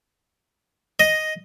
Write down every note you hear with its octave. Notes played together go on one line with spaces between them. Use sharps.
D#5